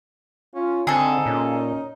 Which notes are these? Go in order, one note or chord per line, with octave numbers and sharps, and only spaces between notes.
C#4 F4
D3 C4 D#4 G#4 A4
A#2 C#4